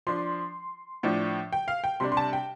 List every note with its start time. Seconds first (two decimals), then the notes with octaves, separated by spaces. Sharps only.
0.07 F3 D4 C6
1.03 A2 F3 D4
1.53 G5
1.68 F5
1.84 G5
2.00 C3 G3 D4 C6
2.12 C6
2.17 A5
2.33 G5